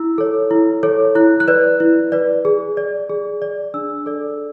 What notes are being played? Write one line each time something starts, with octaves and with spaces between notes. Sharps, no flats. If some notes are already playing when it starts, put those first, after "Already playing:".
Already playing: E4 E6
A4 C#5
E4
A4 C#5
E4 F#6
F#6
B4 D5
E4
B4 D5
G#4
D5
G#4
D5
D4 E6
A4 D5